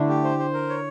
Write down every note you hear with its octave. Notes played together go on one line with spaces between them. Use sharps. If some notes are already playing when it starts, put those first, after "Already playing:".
Already playing: D3 A3 D4 E4
G4
C5
C5
A#4
C#5